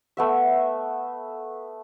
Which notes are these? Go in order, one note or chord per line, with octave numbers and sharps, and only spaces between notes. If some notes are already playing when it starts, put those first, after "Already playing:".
A3 B3 E5